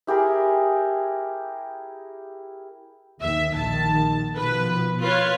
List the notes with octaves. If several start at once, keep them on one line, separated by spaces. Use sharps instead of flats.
E4 G4 G#4 A#4
D#2 D#3 E5
A#1 D#3 A5
B2 F3 B4
F4 B4 C#5